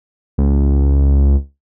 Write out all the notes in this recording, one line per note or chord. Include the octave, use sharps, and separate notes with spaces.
C#2